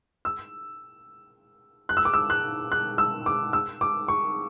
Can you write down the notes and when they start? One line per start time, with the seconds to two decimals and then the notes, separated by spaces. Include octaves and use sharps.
0.25 E6
1.89 F#6
1.97 E6
2.05 D6
2.14 E6
2.30 F#6
2.72 F#6
2.98 E6
3.26 D6
3.53 E6
3.81 D6
4.08 C#6